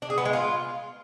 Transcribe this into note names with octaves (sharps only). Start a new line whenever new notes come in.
D4
G#4
B3
G#3
F4